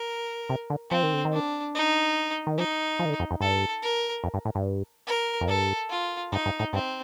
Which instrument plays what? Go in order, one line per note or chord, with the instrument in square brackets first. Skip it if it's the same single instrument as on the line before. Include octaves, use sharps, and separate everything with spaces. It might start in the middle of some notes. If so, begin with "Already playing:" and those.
Already playing: [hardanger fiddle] A#4
[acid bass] C3
D3
[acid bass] F3 [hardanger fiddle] C4
[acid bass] D#3
D3
D#3
[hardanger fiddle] D4
D#4
[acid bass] D#3
[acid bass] F3 [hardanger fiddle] D#4
[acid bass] F3
D#3
D3
F2
F2
[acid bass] G2 [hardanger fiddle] A4
[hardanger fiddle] A#4
[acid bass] F2
G2
A2
G2
[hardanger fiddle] A#4
[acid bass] F2
[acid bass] G2 [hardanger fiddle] A4
[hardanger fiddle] F4
[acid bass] G2 [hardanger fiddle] D#4
[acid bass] G2
A2
[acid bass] G2 [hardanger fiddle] C4